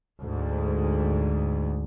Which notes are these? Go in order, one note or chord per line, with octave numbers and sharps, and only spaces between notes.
D2 G#2